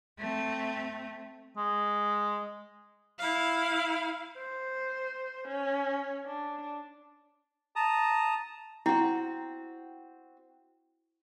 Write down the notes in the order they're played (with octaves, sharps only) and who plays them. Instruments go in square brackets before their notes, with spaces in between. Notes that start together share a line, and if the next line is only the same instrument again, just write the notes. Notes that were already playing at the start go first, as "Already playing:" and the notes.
[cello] A3 C4
[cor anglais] G#3
[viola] E4 F5
[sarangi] C5
C#4
D4
[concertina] A5 A#5 D#6
[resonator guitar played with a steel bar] C4 F#4 [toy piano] E4